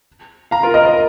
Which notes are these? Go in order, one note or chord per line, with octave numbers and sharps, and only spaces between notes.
F5 A#5
F4 A#4
A#4 D#5
A#4 D#5